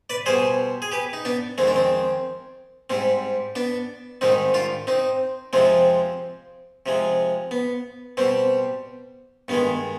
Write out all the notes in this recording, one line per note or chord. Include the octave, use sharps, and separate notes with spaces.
B4 D5
B2 G3 G#4 C5
G#4
G4 B4
D#4
B3 D4
F2 D#3 G#3 C4
D4
C4
G#2 G3 C4
B3 D4
G#2 D#3 G3 C4 D#4
D4 F4
C4 D#4
F2 C3 F3 G#3 C4
C3 F3 G#3
B3
B2 G3 C4
G2 D#3 G#3 B3